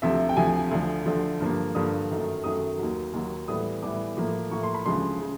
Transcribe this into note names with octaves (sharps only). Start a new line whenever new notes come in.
D2 C3 F3 E5
G5
D2 C3 F3 G#5
D2 D3 F3
D2 D3 F3
G2 D3 F3 A#3
G2 D3 F3 A#3 D#6
F#2 D#3 F#3 A3
F#2 D#3 F#3 A3 D#6
D#2 D#3 F#3
D#2 D#3 F#3
A2 E3 G3 B3 D#6
A2 E3 G3 B3 D6
A2 F3 A#3
A2 F3 A#3 C#6
C6
B5
D2 C#3 F3 G#3 C6
C#3